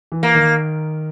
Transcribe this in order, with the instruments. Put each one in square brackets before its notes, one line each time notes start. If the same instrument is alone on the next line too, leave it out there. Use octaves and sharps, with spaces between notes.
[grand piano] E3
[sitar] A#3
[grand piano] D#3